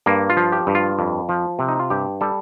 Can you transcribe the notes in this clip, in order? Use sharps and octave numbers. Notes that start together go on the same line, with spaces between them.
G2 A#3
F4
F3
G4
G2
F4
F2
F3
C3
D#4
F4
G2 G4
G3 A4